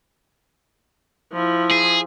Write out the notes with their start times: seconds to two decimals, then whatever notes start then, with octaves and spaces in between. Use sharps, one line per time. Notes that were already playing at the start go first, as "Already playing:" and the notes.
1.33 F3 E4
1.71 G#4